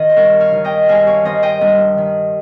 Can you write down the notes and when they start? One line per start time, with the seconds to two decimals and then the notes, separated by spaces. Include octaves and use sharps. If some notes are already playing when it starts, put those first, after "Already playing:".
Already playing: D#3 D#5 F5
0.10 C5
0.16 G2 A#4 C#5
0.40 C#5 F5
0.53 D#3
0.64 D#5 G5
0.88 G2 F5 G#5
1.07 C#5 F5
1.25 D#3 C5 D#5
1.43 D#5 G5
1.61 G2
1.98 D#3